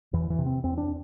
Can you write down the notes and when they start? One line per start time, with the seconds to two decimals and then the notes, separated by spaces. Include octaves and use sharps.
0.13 E2 E3
0.30 E3
0.39 C3
0.46 C4
0.64 E2 C4
0.78 D4